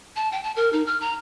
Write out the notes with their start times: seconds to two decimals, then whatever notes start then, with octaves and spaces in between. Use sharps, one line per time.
0.16 A5
0.32 G5
0.44 A5
0.56 A#4
0.73 D#4
0.86 F6
1.01 A#5